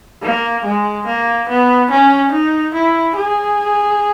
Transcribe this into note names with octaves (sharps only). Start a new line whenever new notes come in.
A#3
G#3
A#3
B3
C#4
D#4
E4
G#4